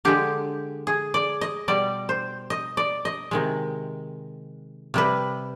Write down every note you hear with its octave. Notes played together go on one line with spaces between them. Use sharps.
D3 G#3 G4
G#4
D5
D#5
B2 G3 D5
C5
D#5
D5
D#5
C3 D#3 G#3
C3 G3 B4